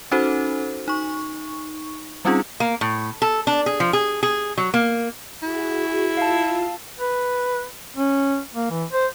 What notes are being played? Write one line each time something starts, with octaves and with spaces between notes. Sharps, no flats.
C#4 D#4 F#4 A4 C5
D#4 C#6
G3 C4 C#4 D#4 F4 G#4
A#3
A2
A4
D4
G#4
F3
G#4
G#4
F#3
A#3
E4 F#4 G#4
F4 F5 A5 E6
B4
C#4
A#3
E3
C5